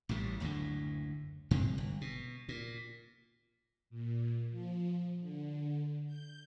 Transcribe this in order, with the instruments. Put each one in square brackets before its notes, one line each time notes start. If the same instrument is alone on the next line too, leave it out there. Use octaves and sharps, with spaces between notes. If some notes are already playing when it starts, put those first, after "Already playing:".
[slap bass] A1 A2 C#3 G3
F#1 D2 A2 D3
G2 C3 G#3 C4
G1
B2
A#2
[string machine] A#2
F3
D3
G6